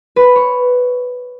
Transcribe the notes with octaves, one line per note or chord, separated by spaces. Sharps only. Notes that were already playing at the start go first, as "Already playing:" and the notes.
B4
C#5